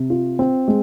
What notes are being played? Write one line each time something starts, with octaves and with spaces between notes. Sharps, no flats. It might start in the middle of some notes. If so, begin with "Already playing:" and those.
Already playing: C3
F4
C4
G#3